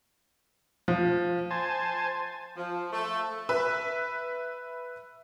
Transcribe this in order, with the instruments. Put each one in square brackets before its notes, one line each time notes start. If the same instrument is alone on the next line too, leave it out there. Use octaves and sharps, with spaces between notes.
[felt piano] F3
[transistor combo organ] C5 G#5 A5
[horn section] F3
A3
[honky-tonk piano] B4 E5